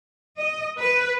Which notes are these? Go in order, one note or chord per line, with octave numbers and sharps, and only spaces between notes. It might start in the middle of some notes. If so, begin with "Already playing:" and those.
D#5
B4